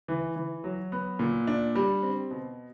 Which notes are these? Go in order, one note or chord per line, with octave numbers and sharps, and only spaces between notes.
E3
E3
F#3
B3
A#2
D4
G3
C4
B2